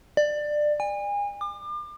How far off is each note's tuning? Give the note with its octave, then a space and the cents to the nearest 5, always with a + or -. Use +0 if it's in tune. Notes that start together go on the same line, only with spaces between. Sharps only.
D5 +20
G#5 -35
D6 +35